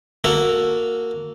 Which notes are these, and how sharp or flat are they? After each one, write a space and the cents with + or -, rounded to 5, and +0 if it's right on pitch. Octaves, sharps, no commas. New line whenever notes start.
A#3 -10 F#4 -20 A4 +0